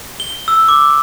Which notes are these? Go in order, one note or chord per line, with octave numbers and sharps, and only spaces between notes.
G7
E6
D6